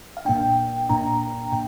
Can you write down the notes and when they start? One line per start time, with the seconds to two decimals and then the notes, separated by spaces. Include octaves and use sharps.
0.17 F5
0.25 A#2 A#3 D4 G5
0.89 A#2 A#3 D4 A#5
1.52 A#2 G5